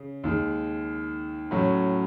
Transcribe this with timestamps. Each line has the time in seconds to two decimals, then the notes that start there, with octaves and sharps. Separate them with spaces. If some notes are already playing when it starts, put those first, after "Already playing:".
Already playing: C#3
0.24 D#2 D#3 G#3
1.51 A2 F#3 C#4